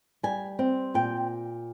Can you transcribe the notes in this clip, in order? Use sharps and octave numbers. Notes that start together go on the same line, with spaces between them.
G3 G#5
C4
A#2 G5